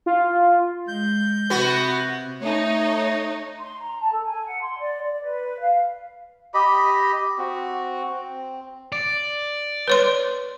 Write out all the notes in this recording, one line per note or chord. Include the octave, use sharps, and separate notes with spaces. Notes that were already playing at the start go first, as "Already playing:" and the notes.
F4
G#3 G6
C3 B3 F#4
A3 D#4 C#5
C6
A#5
A5
A4
G#5
F#5
C6
D5
D5
B4
F5
G4 D#5 B5
C4 F#4
C4
D5
B4 C#5 C6